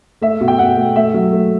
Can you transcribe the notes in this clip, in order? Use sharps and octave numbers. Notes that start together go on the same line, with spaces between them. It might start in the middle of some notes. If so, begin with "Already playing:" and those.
A3 E5
B2
G5
B2 F#5
A3
A3 E5
F#3
A3